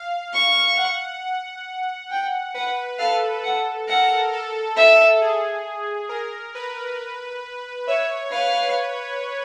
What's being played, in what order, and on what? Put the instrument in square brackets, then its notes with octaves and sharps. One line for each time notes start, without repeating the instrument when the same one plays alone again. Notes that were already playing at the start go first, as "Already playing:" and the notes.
Already playing: [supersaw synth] F5
[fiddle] C#6
[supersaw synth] F#5
[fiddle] G5
[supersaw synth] B4 [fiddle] F#5
[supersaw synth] A4 [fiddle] F5
[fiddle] F#5
[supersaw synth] A#4 [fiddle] F#5
[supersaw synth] A4
[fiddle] E5
[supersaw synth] G#4
A#4
B4
[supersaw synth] C#5 [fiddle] E5
[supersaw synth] B4 [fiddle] F5